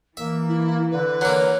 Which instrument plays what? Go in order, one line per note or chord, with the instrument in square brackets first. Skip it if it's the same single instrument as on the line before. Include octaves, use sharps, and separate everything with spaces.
[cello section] E3 [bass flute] A#3 [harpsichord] E5
[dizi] E4
[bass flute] D3 [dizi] B4
[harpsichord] F#3 A#3